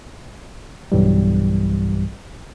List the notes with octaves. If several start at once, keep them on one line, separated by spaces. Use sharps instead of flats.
B1 G2 E3 G3